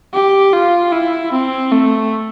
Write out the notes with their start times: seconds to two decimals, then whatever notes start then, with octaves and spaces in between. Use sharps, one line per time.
0.14 G4
0.53 F4
0.92 E4
1.32 C4
1.72 A3